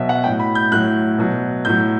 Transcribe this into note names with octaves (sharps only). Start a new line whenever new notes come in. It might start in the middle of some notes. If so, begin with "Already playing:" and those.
Already playing: B2 F#3 E5
F#5
A2 F#3 G5
B5
G6
A2 F#3 F#6
B2 F#3
A2 F#3 G6